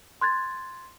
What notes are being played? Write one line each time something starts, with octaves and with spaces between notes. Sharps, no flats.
C6 F#6 G#6 A6